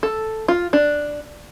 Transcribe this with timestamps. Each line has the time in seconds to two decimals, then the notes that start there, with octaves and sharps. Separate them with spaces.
0.03 A4
0.48 F4
0.73 D4